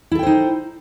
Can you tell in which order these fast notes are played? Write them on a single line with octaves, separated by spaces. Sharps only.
E4 A4 G5 C5 D#4